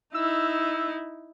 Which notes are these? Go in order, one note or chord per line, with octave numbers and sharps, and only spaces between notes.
D#4 E4 E6